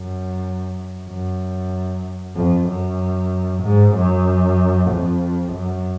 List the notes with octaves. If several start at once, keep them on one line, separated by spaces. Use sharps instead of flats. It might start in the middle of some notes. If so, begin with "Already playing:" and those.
Already playing: F#2
F#2
F2
F#2
G#2
F#2
F2
F#2